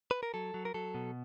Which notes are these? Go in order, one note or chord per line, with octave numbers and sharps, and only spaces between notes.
B4
A#4
F#3 A4
F#3
A#4
F#3 A4
B2